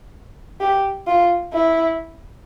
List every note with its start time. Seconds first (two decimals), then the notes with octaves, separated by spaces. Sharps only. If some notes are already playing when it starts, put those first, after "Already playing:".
0.60 G4
1.07 F4
1.54 E4